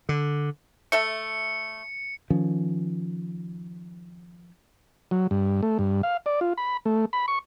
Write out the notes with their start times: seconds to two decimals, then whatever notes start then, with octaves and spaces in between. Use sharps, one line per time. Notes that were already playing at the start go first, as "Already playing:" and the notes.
0.09 D3
0.92 A3 A4 E5 C#7
2.30 D#3 F3 C#4
5.11 F#3
5.31 G2
5.63 A3
5.79 G2
6.03 F5
6.26 D5
6.41 F4
6.58 B5
6.86 A3
7.13 B5
7.28 C#6